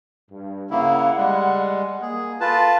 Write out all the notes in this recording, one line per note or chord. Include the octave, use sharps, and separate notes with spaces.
G2
C#3 A#3 E4 F#5
G3 G#3
A#3 G#4
F4 A4 B4 A5